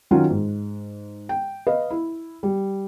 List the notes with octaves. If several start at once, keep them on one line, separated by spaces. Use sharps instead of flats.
D#3 F#3 C#4 F4 F#4
G#2
G5
B4 D#5 F5
E4
G3